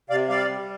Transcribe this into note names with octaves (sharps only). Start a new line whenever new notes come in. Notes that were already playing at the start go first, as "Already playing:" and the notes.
C3 D5 F5
G3 D5 F5
G3